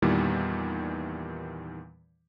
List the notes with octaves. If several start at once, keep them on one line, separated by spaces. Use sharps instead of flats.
E2 A#2 D#3 E3 G3